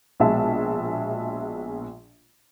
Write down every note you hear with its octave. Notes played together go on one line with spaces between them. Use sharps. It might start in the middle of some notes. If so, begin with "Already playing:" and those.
A#1 B2 G#3 E5 A5